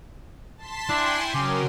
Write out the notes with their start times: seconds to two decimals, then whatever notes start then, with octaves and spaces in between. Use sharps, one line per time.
0.57 A5 C6 B6
0.89 D4 E4 G5 G#5 C6
1.34 C#3 F#3 A#4 D6